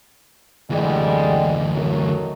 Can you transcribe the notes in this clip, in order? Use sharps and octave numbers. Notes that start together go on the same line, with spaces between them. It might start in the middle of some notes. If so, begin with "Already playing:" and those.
D2 D3 E3 G3 G#3
D#3 F#3 A3